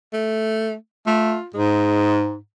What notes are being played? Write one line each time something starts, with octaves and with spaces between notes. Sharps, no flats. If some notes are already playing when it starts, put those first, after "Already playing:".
A3
A3 F4
G#2 G#3